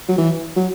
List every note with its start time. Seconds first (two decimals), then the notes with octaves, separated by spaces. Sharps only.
0.09 F#3
0.18 E3
0.56 F#3